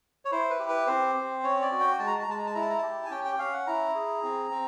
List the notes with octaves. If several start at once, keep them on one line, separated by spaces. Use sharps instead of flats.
C#5
E4 C5
B4
G4
B4
C4 C5
C4
C#4 C#5
D5
F#4
G5
G#3 A5
A#5
A5
A#5
G#3 A5
A#5
A5
E4 A#5
A5
A#5
G4 A5
G#5
C#4 G5
G5
C#4 F5
F#5
E4 A#5
G#4
C4
C4